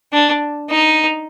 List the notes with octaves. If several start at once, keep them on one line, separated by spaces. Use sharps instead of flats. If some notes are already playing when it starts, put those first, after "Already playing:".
D4
D#4